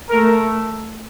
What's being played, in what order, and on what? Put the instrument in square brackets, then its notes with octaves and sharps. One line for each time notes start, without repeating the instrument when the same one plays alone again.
[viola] A3 [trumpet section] A#4